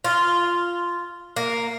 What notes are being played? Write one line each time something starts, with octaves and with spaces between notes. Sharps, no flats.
F4
A#3